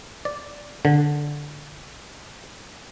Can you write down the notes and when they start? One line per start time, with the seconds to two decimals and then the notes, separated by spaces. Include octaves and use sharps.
0.25 D5
0.85 D3